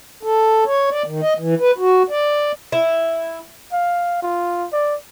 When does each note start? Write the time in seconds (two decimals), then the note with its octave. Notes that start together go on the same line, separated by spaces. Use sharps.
0.23 A4
0.66 C#5
0.91 D5
1.06 D#3
1.21 D#5
1.39 E3
1.59 B4
1.78 F#4
2.10 D5
2.72 E4
3.72 F5
4.22 F4
4.72 D5